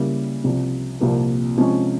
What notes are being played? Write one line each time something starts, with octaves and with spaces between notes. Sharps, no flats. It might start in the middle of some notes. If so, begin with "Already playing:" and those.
Already playing: C#3 G3 A#3 E4
C2 C3 F3
C2 A#2 F3 A#3
C3 F3 G#3 C#4